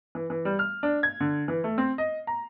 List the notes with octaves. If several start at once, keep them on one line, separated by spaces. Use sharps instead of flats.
E3
E3
G3
F6
D4
G#6
D3
E3
A3
C4
D#5
A#5